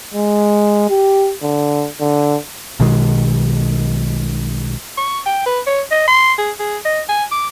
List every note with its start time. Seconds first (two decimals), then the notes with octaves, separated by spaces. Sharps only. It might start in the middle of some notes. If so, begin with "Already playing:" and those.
0.14 G#3
0.90 G4
1.42 D3
2.00 D3
2.80 B1 B2 D#3 G#3
4.97 C#6
5.26 G5
5.46 B4
5.67 C#5
5.91 D#5
6.07 C6
6.38 G#4
6.59 G#4
6.85 D#5
7.09 G#5
7.31 D6